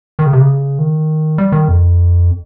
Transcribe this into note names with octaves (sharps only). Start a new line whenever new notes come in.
D#3
C#3
C3
C#3
D#3
G3
D#3
F2